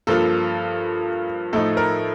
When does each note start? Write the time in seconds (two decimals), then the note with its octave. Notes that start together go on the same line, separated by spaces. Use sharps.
0.07 G2 F3 A#3 F4 A4
1.53 A2 F3 A3 D#4 A4
1.77 A#4